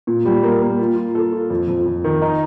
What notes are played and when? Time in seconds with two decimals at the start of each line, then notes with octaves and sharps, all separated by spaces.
0.07 A#2
0.25 G3
0.43 A#3
0.61 A#3
0.79 F4
0.97 F4
1.15 A4
1.33 F4
1.50 F2
1.68 F2
1.86 F2
2.04 D#3
2.22 D#4